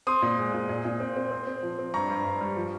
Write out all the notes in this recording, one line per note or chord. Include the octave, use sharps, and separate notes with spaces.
C4 C6 D#6
A#2
G#3
A#2
A#2
A#2
C4
C4
C4
C4
F3
C4
G2 A#5 C#6
G2
G2
G3
F3